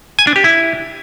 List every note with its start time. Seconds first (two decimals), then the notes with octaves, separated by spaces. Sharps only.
0.19 G#5
0.27 D4
0.36 G4
0.44 E4